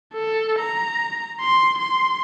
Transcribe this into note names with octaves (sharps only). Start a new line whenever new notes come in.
A4
A#5
C6
C6